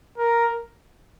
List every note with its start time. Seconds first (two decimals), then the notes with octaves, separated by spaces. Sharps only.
0.18 A#4